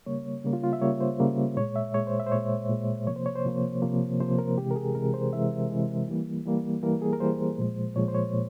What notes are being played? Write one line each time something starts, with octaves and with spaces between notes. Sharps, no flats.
C#3 G3 A#3 C#5
C#3 G3 A#3
F4
F4
E5
C#3 G3 A#3 C#5
C5
C#3 G3 A#3
A#2 G#3 C#5
E5
A#2 G#3 C#5
C5
E5
C5
A#2 G#3 C#5
A#2 G#3
C3 F3 A#3 C#5
C5
C#5
C5
C3 F3 A#3
C3 F3 A#3
C3 F3 A#3 C5
A#4
C3 E3 G#3 G4
A#4
G#4
C3 E3 G#3 A#4
C5
C3 E3 G#3 E5
C3 E3 G#3
E3 G3 A#3
E3 G3 A#3
E3 G3 A#3 A#4
G#4
A#4
E3 G3 A#3 C5
A#2 F3 G#3
A#2 F3 G#3 C#5
C5
C#5
A#2